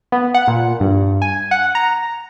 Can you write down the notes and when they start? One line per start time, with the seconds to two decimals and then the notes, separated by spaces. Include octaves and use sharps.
0.12 B3
0.34 F#5
0.47 A#2
0.80 G2
1.22 G#5
1.51 F#5
1.75 A#5